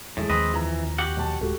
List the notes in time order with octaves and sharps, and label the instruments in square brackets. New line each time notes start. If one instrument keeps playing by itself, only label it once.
[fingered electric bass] E2 E3 F3 [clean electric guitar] A2 [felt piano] G#3 G#4
[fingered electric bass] D#2 F3 [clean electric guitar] C4 B4 D#5
[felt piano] F2 A#5 [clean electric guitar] E3
[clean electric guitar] F#4 G4 F#5
[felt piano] B1 A5
[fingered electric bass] D1 G#3 [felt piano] F#4 G4 A4